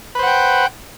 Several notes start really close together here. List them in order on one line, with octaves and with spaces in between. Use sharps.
B4 C5 F#5 G5